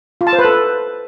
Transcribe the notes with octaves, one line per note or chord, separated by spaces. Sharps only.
F4
A5
C5
B4
A4